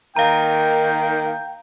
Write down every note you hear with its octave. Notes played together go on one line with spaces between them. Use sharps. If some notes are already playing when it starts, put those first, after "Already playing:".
D#3 A#3 F5 G5 A#5